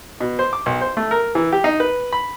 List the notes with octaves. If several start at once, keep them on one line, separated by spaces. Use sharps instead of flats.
B2
C5
D6
B1
C5
A3
A#4
E3
G4
D#4
B4
B5